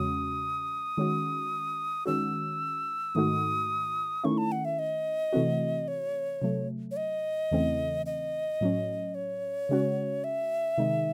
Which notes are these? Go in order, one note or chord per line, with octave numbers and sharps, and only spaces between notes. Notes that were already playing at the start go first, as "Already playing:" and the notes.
Already playing: E2 C#3 G#3 C#4 F#4 D#6
D#3 G#3 C#4 F#4
D#3 G#3 C#4 F#4 E6
G#2 D#3 A3 D#4 F#4 D#6
D#3 A3 C#4 E4 C#6
A5
F#5
E5
D#5
C3 E3 A3 C4 F#4
C#5
C3 F#3 A3
C#5
D#5
E2 C#3 E3 A3 C4
D#5
A2 F#3 C#4
C#5
C#3 G#3 C#4 F#4
E5
C3 D#3 G#3 D#4